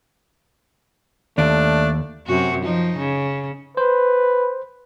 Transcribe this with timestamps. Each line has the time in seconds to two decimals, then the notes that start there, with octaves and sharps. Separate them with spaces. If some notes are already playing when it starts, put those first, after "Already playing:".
1.38 D#2 A3 D4
2.27 F#2 C3 F#4
2.64 F3 D#4
2.98 C#3
3.77 B4 C5